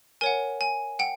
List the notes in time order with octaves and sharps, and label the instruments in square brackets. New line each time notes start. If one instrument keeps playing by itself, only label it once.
[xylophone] A#4 C#5 F#5 G#5
G#5
F#5 G5